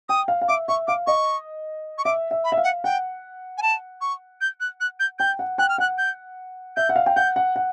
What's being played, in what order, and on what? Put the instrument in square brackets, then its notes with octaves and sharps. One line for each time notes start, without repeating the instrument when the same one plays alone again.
[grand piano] G5 [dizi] D#6
[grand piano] F5
F5
[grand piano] E5 [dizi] D6
[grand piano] E5 [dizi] C#6
[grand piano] F5 [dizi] D6
[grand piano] D#5 [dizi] C#6
[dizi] C#6
[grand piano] E5 [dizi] D6
[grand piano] E5
[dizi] B5
[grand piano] E5
F5
[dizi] F#5
[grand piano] F#5 [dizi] G5
[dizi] G#5
A5
C#6
G6
F#6
F#6
G6
[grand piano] G5 [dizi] G6
[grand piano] F#5
[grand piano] G5 [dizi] F#6
[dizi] F6
[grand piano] F#5 [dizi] F#6
[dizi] G6
[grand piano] E5 [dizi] G6
[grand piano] F#5
F5
G5
[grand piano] F#5 [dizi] G6
[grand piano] F#5
F#5